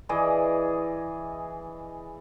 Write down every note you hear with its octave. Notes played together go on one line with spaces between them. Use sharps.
E3 G#4 D5 D#5